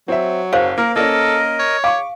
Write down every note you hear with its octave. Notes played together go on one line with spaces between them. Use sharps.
F#3 C4 E5
F#1 C5 F5
A#3 A#4
A#3 C#4 A4 A#4 D#5
C#5
F5 C#6 D6